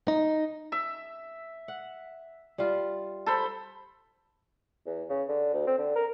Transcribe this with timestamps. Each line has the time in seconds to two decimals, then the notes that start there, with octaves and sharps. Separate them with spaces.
0.08 D#4
0.72 E5
1.68 F#5
2.58 G3 F4
3.26 A4 C5 B5
4.86 E2
5.09 C#3
5.29 D3
5.53 D2
5.67 C4
5.78 D3
5.96 A#4